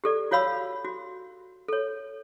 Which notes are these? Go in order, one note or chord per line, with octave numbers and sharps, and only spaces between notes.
G4 A4 D5
F4 F#4 C#5 F5 B5 E6
F#4
A4 C#5